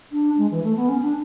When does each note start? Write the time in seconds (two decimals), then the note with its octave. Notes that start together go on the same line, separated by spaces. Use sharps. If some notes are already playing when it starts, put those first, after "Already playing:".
0.12 D4
0.38 G#3
0.51 E3
0.64 A3
0.76 B3
0.89 C#4
1.02 D4